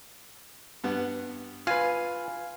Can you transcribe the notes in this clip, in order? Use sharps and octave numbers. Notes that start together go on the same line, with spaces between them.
G2 B3 F#5
F4 B4 F5 G#5